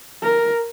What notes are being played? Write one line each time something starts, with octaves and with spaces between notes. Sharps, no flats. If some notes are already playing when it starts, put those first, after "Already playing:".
A#4